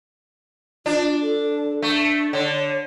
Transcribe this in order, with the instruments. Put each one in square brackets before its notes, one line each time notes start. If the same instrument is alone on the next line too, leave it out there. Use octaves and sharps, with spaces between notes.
[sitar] D4 [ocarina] F4
[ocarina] A4
[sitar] A3 [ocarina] D4
[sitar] D3 [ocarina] C#5